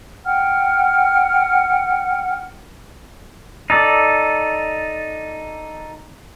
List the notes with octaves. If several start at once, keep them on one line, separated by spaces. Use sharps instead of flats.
F#5 G5 F6
D#4 A4 D5